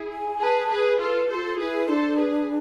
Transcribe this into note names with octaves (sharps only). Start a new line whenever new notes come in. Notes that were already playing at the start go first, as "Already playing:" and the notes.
Already playing: E4 G#4
G#5
G#4 B4 A5
G#4 B4
F4 A4 B4
F4 G#4 A4 C5
E4 G#4 B4
D4 A4 C5
G#4 B4